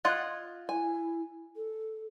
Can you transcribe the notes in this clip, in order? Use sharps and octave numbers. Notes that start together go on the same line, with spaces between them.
F4 D#5 F#5 F#6 G#6 A6
E4 G#5
A4